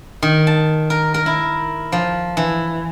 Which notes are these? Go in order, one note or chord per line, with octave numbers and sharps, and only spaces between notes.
D#3
A5
A#4
A#4
E4
F3
E3